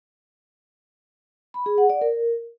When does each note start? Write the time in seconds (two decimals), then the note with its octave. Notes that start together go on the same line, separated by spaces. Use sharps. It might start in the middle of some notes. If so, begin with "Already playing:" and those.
1.54 B5
1.66 G#4
1.78 F#5
1.90 D5
2.01 A#4